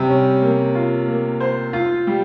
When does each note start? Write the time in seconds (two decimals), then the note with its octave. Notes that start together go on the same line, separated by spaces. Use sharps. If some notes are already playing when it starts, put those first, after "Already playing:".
Already playing: C3 G3 G4
0.09 C#4
0.42 A#3
0.75 F4
1.08 A#3
1.40 C5
1.73 F4
2.07 G3